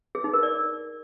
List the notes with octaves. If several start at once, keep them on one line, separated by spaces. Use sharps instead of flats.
G#4
D#4
A#4
D5